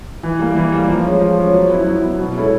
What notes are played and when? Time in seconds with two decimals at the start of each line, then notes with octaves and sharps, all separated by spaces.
0.23 E3
0.39 G3 A#3
0.56 E3
0.72 G3 A#3
0.88 F3
1.05 G#3 C#4
1.21 F3
1.38 G#3 C#4
1.54 F#3
1.70 B3 E4
1.86 F#3
2.02 B3 E4
2.19 B2
2.35 G#3 C#4 E4 A4